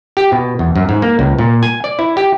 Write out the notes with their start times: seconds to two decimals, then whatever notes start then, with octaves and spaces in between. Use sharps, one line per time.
0.17 G4
0.32 B2
0.59 E2
0.76 F#2
0.89 G#2
1.02 A#3
1.19 C#2
1.39 A#2
1.63 G#5
1.84 D5
1.99 E4
2.17 G4